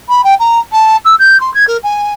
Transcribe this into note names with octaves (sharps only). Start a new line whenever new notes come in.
B5
G5
A#5
A5
E6
G6
C6
G#6
A#4
G#5